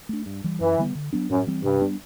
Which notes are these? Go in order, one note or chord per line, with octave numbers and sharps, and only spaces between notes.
A3 D4
G2
E3 G3
F#2 E3
D3 G3 B3
D3
F#3 B3 D4
F#2 A2
E3 G3 C4
G2 C3
G3 B3 D4